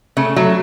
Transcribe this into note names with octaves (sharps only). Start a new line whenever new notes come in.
C#3 A3
F#3 A3